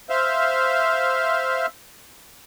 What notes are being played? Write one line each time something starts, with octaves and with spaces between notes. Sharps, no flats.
C5 E5 F5